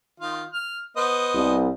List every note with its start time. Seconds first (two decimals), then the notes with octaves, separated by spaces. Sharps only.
0.20 D#3 F4 F5
0.53 F6
0.96 B3 C5 D#5
1.35 C2